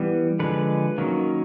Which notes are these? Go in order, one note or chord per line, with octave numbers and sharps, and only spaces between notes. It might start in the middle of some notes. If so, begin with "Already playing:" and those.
Already playing: E3 G3 B3
D3 F3 G#3 B4
D#3 F#3 A#3 C#4